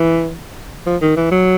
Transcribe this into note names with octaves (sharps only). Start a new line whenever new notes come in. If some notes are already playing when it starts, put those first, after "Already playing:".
Already playing: E3
F3
D#3
E3
F#3